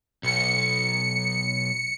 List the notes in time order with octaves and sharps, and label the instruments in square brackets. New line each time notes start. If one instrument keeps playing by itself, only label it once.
[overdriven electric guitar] B1 [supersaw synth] C#7